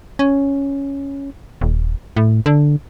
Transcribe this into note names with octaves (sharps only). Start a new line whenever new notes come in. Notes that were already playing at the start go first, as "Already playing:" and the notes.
C#4
D#1
A2
D3